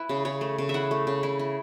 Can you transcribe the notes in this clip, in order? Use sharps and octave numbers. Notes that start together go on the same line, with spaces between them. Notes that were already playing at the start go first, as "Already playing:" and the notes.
Already playing: E4 B4
C#3
C#3 C#5
A3
C#3
E5
E4 F#5
A3
C#3
E4
E4